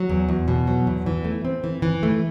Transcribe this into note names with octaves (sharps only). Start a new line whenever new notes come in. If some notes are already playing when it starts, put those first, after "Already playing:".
Already playing: F#3
E2
E2
B2
F#3
E2
E3
A3
C4
E3
E3
A3